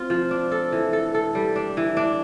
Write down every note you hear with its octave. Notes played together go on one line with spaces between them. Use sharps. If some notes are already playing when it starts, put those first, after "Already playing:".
Already playing: C4 F4
F3
D4
A4
E3
A4
A4
G3
D4
E3
D4